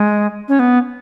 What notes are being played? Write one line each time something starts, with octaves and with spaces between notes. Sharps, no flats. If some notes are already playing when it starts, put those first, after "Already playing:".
Already playing: G#3
C#4
B3